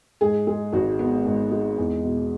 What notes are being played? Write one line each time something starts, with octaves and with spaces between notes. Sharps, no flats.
G#2 G#4
G#3 G#4
G#1 F#4
B3
G#2
G#3
E2
B2